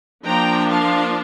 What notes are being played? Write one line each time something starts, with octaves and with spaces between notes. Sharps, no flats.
F3 A#3 D4 G5 A#5
F5 A5